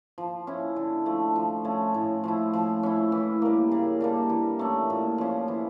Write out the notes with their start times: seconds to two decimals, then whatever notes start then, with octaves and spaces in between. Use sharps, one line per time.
0.18 F3
0.47 C#4 E4
0.76 D3
1.06 F3 A3
1.36 F3
1.64 A3 C#4 F4
1.94 A2
2.24 F3 C#4 E4
2.53 F3
2.83 C#4 E4
3.12 E3
3.42 G3 A#3
3.72 C#3
4.01 G3 A#3 D4
4.30 E3
4.59 A3 C#4
4.90 A#2
5.18 F3 C#4
5.48 E3